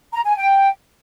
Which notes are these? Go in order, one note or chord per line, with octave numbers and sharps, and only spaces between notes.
A#5
G#5
G5